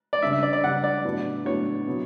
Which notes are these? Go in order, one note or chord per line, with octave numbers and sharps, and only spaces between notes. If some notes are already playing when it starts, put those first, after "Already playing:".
D5
C#3 G3 D4 E5
E5
D5
D5
C#3 G3 D4 F#5
D5
A2 F#3 B3 D4
A2 F#3 B3 D4 C#5
B2 F#3 B3